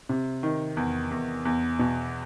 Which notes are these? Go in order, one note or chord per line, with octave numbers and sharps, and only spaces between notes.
C3
D#3
E2
E2
E2
B2